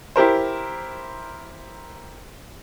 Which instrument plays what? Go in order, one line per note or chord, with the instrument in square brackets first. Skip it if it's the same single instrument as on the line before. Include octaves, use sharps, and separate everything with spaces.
[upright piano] E4 G4 A#4 C5